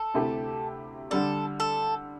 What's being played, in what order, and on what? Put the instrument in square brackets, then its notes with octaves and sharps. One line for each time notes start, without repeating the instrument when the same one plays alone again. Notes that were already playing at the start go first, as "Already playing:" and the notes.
Already playing: [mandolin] A4
[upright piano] D2 C3 A3 E4 G4
[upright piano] D3 G3 D4 [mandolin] A4
[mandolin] A4